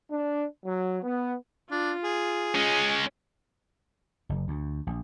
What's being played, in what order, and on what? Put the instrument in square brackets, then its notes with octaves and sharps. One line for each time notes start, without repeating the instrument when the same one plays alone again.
[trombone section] D4
F#3
B3
[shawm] D4 [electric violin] F4
[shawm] G#4
[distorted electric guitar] G#3 C#4
[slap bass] F#1
D2
A#1